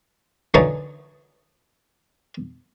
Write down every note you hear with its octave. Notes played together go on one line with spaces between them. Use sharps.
D3 E3 F#3 D#4 C#5